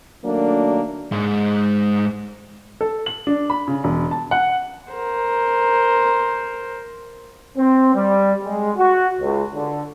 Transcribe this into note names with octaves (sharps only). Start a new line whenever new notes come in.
D#3 F#3 A3 A#3 D4
G#2 G#3
A4
F#7
D4
B5
C#3
E1
A5
F#5
A#4 C5
C4
G3
G#3
F#4
C#2
D3